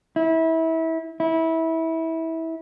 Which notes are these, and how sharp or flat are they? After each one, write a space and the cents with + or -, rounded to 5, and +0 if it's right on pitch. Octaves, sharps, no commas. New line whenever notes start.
E4 -25
E4 -20